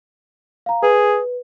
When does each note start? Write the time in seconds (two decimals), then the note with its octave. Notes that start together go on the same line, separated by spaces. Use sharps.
0.66 F5 A#5
0.83 G#4 B4